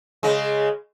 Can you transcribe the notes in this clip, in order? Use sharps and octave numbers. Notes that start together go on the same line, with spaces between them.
C#3 G#3